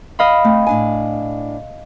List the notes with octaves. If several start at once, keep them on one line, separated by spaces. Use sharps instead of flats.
D#5 F5 B5
A3 C4
A2 D4 G#5